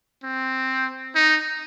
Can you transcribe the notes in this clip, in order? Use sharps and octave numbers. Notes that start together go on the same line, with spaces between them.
C4
D#4